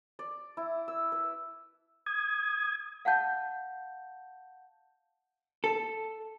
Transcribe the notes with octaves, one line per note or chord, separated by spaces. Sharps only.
D5
E4
E6
B4
D#6 G#6
F5 F#5 A5 G6
A4